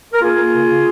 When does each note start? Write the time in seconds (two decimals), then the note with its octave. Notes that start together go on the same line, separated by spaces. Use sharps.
0.13 A#4
0.22 A#3 F4 G#4
0.37 A#3
0.54 C#3
0.69 C#3